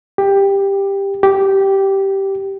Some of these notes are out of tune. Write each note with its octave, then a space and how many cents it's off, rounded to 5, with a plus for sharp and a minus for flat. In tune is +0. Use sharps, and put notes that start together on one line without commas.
G4 +10
G4 -10